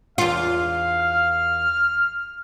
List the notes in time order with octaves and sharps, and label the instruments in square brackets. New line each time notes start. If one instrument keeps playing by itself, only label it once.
[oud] E2 F4 [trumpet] F5
[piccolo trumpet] F6